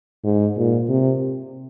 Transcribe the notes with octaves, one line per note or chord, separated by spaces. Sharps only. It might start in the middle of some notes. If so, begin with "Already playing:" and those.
G#2
A#2
C3